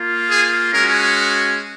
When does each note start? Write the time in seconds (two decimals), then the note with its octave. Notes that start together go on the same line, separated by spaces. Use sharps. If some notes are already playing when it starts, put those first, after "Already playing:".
Already playing: A#3 F4
0.29 G#4
0.72 G#3 C#4 F#4 A#4